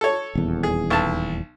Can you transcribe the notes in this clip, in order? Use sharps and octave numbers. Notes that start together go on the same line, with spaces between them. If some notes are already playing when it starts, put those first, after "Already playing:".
A4 C#5
D#1 E2
G#4
B1 A5